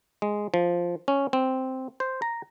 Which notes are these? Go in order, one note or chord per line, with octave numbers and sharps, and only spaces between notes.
G#3
F3
C#4
C4
C5
A#5